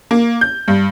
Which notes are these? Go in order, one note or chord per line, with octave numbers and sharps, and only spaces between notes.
A#3
G6
G2